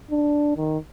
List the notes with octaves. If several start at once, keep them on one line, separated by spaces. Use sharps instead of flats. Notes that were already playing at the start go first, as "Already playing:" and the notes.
D4
D#3